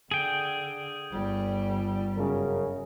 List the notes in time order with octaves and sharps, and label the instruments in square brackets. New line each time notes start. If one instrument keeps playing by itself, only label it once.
[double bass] D3 [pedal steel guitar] G#4 G5
[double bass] G1 G3
[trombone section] F#2 C#3 A#4